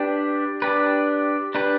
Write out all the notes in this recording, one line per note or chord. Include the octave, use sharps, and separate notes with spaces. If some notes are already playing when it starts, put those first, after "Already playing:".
Already playing: D4 G4 B4
D4 G4 B4
D4 G4 B4